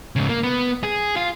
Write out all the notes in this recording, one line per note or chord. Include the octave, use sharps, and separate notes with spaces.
G#2 C#3
A#3
B3
G#4
F4